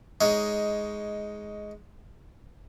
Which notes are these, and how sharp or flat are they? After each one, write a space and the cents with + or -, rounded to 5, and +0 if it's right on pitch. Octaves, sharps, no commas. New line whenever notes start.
G#3 +10 D#4 +5 C#5 +10